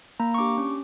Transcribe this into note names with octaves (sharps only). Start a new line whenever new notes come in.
A#3 A#5
C#6
D4 G4 D6
C#4